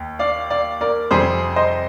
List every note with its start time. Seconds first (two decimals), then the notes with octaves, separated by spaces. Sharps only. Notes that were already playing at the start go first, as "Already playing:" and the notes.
Already playing: D#2
0.19 D5 F5
0.50 D5 F5
0.81 A#4 D5
1.11 F2 C3 G3 C4 G#4 C5
1.56 C5 D#5